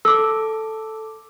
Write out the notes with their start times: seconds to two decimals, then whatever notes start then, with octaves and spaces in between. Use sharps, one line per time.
0.05 A4 D6 E6